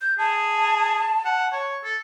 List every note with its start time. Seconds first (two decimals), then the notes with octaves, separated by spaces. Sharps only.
0.01 G6
0.18 G#4 A5
1.25 F#5
1.52 C#5
1.84 A4